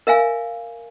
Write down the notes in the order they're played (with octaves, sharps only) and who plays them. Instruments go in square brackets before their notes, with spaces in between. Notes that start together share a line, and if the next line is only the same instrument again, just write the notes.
[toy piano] A#4 E5 F5 G#5